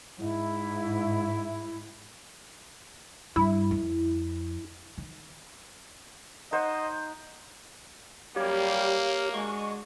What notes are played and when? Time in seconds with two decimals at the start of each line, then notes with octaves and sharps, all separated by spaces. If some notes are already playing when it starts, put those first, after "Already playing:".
0.19 G#2 E4
3.36 G2 E4
3.71 F2
4.98 D#3
6.52 D#4 C5 D#5 F#5
8.36 F#2 G3 A#3 G4 C#5 F5
9.34 G#3 D4 F#4 C#6